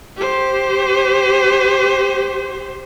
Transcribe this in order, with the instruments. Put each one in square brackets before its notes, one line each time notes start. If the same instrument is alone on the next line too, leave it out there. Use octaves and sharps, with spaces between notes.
[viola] G4 C5